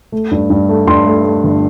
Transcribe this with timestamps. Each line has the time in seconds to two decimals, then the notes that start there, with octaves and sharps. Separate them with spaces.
0.12 A3
0.31 G2
0.50 G2
0.69 A3
0.87 G2 C6
1.06 A3
1.24 A3
1.43 G1